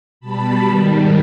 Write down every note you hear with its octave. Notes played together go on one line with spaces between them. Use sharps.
B2 G3 A5 B5
G#2 D#3 G3